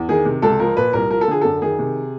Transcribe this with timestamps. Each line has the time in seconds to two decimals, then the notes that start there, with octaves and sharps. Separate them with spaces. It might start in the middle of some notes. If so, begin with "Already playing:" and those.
Already playing: E2
0.09 D#3 G#4
0.25 C3
0.42 C#2 A4
0.59 F3 A#4
0.77 A#2 B4
0.93 C2 A#4
1.10 F3 A#4
1.21 A4
1.28 D3 G#4
1.41 F#2 A4
1.62 D#3 G#4
1.79 C3